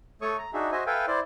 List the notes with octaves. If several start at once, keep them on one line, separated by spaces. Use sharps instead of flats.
A3 A4 C#5 C#6 D#6
A#5
D4 D#4 F#4 G#4 E5
F#4 C5 D#5 E5 G#5
A4 B4 E5 F5 G5 G#5
E4 C5 D5